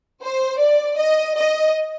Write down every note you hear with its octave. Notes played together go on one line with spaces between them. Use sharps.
C5
D5
D#5
D#5